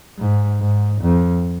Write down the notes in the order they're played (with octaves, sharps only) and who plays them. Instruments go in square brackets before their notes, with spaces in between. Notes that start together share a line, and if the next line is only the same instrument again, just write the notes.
[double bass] G#2
G#2
F2